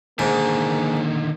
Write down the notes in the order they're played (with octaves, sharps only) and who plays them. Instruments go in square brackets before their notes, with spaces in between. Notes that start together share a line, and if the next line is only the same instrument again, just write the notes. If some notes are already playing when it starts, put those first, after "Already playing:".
[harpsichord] G#2 [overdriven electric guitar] D3 D#3 [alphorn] A#3